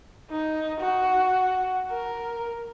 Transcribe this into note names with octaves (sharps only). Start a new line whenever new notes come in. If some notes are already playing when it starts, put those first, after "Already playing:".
D#4
F#4
A#4